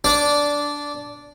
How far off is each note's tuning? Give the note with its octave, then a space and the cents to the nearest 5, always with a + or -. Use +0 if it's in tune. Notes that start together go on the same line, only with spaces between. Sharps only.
D4 -10